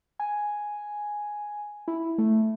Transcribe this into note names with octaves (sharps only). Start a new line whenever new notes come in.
G#5
E4
A3